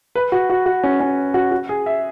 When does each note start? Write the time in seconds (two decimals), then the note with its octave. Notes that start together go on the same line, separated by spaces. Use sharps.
0.15 B4
0.32 F#4
0.50 F#4
0.66 F#4
0.84 C#4
1.00 C#4
1.34 F#4
1.52 F#4
1.69 G#4
1.86 E5